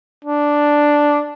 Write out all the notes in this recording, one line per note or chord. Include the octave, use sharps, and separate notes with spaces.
D4